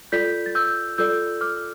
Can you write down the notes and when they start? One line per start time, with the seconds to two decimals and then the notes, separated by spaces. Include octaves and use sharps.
0.12 F4 A4 D5 G6 B6
0.46 A6
0.55 E6 G6
0.98 F4 A4 D5 E6 G6
1.41 D6 F6